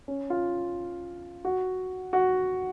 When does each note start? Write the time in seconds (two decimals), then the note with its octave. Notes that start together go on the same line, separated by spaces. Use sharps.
0.08 C#4
0.30 F4
1.45 F#4
2.13 F#4